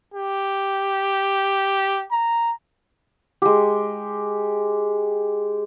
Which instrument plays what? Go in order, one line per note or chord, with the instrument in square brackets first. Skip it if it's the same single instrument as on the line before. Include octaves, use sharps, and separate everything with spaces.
[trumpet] G4
A#5
[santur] G#3 G4